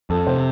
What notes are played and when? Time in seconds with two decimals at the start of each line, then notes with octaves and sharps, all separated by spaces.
0.10 F2 A4
0.27 C3 C5